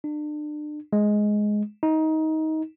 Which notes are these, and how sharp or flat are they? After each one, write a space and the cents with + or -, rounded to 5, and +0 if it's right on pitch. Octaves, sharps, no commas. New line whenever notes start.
D4 +35
G#3 +10
D#4 +20